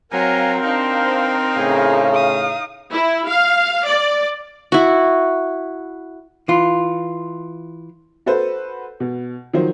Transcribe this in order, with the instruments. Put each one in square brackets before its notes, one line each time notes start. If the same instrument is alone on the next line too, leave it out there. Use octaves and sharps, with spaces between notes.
[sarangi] F#3 [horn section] C4 A#4 F5 [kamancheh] G#5 A#5
[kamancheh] D4 C5 [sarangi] D#4
[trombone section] A2 C#3 [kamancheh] G#4
[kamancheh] F5 D#6
[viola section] E4
F5
D5
[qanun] E4 F#4
[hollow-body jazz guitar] E3 F4
[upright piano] F#4 A4 B4 C5
B2
D#3 F3 F#3 C5